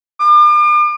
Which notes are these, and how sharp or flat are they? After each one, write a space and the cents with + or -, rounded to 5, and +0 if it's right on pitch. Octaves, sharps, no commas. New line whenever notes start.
D6 +40